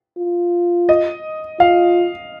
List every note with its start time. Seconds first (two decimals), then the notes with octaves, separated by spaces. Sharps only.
0.18 F4
0.89 D#5
1.60 F4 F5